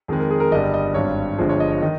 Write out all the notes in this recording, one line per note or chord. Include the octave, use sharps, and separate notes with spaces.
F2 D#3 G#3 G#4
A#4
G#4
A#4
G1 G2 G3 D#5
D#5
G#1 G2 G3 C#5
G1 G2 F3 G#3 C5
C#5
D#5
C#5
D#3 D#5